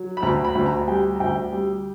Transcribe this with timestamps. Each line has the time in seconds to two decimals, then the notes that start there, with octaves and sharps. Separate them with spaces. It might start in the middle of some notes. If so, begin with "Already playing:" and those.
Already playing: F#3
0.17 B5
0.23 D2 A#5
0.44 B5
0.55 D2
0.66 A#5
0.87 G3 G5
1.16 A#5
1.20 D2 G5
1.53 G3